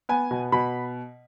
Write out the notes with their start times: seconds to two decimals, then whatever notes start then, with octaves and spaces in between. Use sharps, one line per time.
0.09 B3 G#5
0.31 B2
0.52 B2 B5